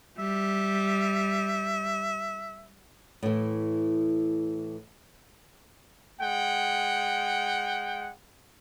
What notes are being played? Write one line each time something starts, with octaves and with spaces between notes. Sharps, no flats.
G3 E5
A2 E3
G#3 F#5 G5